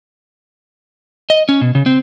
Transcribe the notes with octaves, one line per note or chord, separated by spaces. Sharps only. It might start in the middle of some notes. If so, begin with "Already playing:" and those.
D#5
C#4
B2
C#3
C4